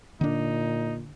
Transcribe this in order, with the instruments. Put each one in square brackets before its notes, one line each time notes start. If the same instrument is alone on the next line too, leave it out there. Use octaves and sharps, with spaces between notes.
[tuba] A#2 [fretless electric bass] D3 D4 [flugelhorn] D#4